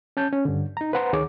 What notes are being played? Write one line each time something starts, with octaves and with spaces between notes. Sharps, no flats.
C#4 A5 G6
C#4
G2 D3
D#4 A#5
B4 C5 F#5 A#5 C6
D2 D#3 G#4 C#5 D6